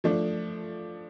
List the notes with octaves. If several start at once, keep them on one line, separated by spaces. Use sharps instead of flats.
F3 A3 D4